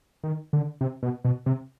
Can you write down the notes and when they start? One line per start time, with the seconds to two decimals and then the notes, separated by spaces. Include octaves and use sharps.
0.23 D#3
0.53 D3
0.81 C3
1.03 B2
1.24 B2
1.46 C3